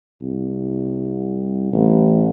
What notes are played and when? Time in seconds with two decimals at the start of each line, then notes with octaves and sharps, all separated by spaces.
0.22 C2
1.73 A1